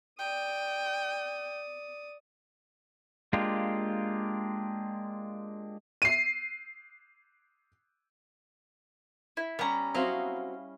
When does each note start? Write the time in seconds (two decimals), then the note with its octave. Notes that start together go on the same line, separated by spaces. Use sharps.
0.19 D5 G5 D#6
3.33 G#3 A#3 D4 F4 G4
6.02 C7 D#7
9.37 E4
9.59 G3 B3 C#4 A#5
9.94 F#3 C4 E4 F#4 D#5 F5